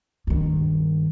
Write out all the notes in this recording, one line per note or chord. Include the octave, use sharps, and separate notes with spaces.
G2 D#3